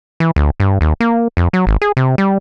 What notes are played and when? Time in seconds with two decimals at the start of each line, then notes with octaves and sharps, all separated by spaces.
0.20 E3
0.36 D2
0.60 G2
0.81 D#2
1.00 A#3
1.37 F2
1.53 F#3
1.67 G#1
1.82 G#4
1.97 C3
2.18 G3